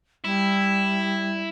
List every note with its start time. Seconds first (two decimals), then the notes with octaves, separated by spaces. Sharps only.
0.25 G3 E4